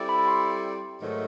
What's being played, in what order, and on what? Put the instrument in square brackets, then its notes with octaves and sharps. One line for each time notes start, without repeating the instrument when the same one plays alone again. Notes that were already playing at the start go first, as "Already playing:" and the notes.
Already playing: [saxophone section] G3 C4 E4 A4 D5
[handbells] B5
C6
[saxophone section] G#2 D#3 F#3 A3